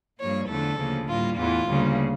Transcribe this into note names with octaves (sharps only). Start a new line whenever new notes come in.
G2 F3 A#3 C#5
E2 D3 F3 A3 A4
D2 C#3 F3 A#3
A2 G3 A#3 F4
E2 E3 A3 F4
D2 C#3 G3 A#3